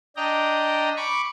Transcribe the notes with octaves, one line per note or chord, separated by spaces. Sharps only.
D4 D#5 G5 A#5
B5 C#6 D6